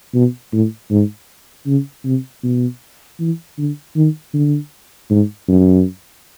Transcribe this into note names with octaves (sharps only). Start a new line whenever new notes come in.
B2
A2
G#2
C#3
C3
B2
E3
D3
D#3
D3
G#2
F#2